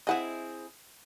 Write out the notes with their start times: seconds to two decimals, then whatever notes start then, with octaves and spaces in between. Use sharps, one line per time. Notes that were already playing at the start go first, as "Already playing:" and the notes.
0.07 C4 E4 G#4 D#5 F#5